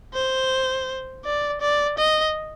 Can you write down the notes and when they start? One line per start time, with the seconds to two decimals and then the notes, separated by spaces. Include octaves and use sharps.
0.14 C5
1.25 D5
1.61 D5
1.98 D#5